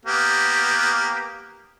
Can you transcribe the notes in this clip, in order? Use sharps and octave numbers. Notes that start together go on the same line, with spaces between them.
A#3 B3 G4